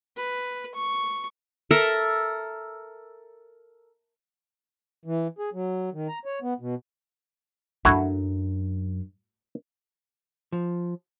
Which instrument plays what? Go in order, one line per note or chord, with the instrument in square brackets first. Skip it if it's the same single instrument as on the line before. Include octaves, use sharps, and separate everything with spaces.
[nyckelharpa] B4
C#6
[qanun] A4 A#4 E5
[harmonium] E3
G#4
F#3
D#3
A#5
C#5
B3
B2
[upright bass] F#2 D4 [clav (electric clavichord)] A3 E4 F#4
[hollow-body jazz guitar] F3